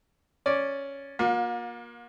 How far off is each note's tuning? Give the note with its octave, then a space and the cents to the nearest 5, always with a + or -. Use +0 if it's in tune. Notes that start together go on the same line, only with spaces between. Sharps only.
C#4 +0 D5 -5
A#3 +25 F4 +45